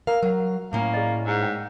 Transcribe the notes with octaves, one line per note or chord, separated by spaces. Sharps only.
A#4 F5 A#5
F#3 A#4 F#5
A2 A#3 C#4
G#4 D5 D#5
G#2
G5